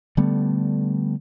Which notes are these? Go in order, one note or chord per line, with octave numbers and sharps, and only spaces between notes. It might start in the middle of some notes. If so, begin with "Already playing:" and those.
D3 G3 A3 B3